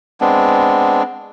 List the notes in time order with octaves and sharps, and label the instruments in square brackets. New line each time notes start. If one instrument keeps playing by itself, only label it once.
[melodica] G#3 B3 C4 D4